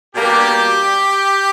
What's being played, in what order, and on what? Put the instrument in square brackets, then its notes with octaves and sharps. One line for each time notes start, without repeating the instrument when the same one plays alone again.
[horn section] B2 G3 A#3 D4 G4